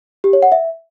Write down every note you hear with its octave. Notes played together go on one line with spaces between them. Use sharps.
G4
C#5
F#5
E5